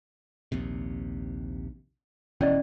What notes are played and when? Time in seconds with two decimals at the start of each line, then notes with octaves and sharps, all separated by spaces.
0.52 A#1 D#2 C3
2.41 F1 B2 E3 C#4 D5 D#5